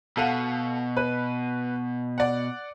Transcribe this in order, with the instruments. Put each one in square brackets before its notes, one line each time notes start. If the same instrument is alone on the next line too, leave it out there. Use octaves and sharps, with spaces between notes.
[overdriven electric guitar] B2 [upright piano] A4 F5 F#5
[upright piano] B4
D5 F#5